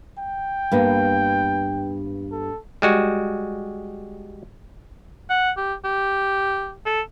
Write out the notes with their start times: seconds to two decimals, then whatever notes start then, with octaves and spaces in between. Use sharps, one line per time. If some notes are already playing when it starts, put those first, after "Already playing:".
0.18 G5
0.72 G2 A#3 B3
2.32 A4
2.82 G3 G#3 F#4
5.30 F#5
5.57 G4
5.84 G4
6.86 A4